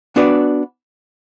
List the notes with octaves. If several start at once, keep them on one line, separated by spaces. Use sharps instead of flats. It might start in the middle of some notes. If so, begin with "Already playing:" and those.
B3 D4 F#4 B4 D5